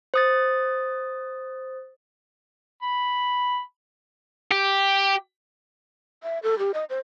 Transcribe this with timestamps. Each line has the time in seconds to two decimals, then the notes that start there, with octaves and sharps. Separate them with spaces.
0.14 C5 D#6 A6
2.82 B5
4.51 G4
6.23 E5
6.43 A4
6.59 G4
6.74 D#5
6.90 C5